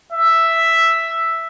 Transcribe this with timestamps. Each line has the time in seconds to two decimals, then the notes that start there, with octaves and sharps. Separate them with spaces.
0.12 E5